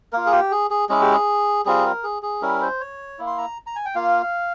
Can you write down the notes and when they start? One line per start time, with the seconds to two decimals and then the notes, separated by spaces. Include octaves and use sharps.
0.13 A#3 F4 A#4
0.26 G#4
0.32 G4
0.51 G#4
0.71 G#4
0.89 G#3 C#4 E4 G#4
1.01 G4
1.13 G#4
1.65 G3 C4 F4 G#4
1.85 A#4
2.03 G#4
2.22 G#4
2.42 G3 C#4 E4 A#4
2.62 C5
2.81 C#5
3.19 A#3 E4
3.27 C6
3.38 A#5
3.67 A#5
3.76 G#5
3.85 G5
3.95 A#3 F4 F5